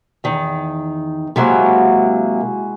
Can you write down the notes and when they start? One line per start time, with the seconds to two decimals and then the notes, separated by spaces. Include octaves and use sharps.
0.24 E2 D#3
1.36 C3 F#3 G#3 A#3 E4 F#4